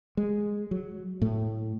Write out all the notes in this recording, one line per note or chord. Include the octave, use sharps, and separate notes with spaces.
G#3
F#3
A2 A3